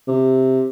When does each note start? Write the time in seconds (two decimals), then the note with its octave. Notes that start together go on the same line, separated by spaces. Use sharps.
0.07 C3